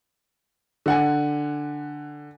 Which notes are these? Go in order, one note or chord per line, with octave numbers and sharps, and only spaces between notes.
D3 F#5 G#5